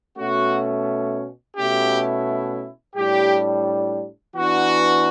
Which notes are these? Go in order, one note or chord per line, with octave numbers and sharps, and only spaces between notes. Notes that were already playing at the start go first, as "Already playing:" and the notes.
B2 A3 C#4 F#4
B2 A3 C#4 E4 G4
A2 G3 D4 G4
E3 B3 D4 F#4